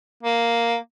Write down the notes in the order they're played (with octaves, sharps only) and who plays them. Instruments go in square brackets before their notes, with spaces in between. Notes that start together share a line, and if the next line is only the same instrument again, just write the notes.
[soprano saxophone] A#3